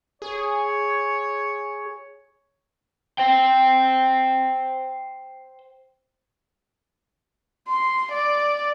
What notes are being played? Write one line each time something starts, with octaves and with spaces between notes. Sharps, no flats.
G#4 C#5
C5 G5
C6
D5